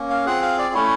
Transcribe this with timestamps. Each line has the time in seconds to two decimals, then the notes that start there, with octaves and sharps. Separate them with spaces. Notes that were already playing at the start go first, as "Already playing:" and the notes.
Already playing: A#3 C#4
0.10 F5
0.26 C4 F4 G#4 F#5
0.42 F5
0.59 D5
0.74 A3 C#4 E4 C#5